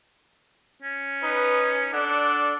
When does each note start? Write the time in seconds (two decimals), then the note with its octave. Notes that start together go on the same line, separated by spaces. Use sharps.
0.83 C#4
1.23 D#4 B4
1.93 D4 A4 D5 F#5